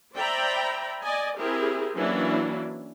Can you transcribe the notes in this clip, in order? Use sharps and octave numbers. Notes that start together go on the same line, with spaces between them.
C5 D5 E5 G5 A#5 B5
D5 D#5 G#5
C4 E4 G4 G#4 A#4
E3 F#3 A#3 C#4 D4 E4